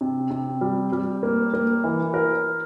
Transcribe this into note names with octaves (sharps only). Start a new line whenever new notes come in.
C3
C3
G3
G3
A#3
A#3
E3
A#4